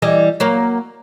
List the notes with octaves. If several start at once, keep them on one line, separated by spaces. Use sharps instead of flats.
E3 G3 D#5
F#3 A#3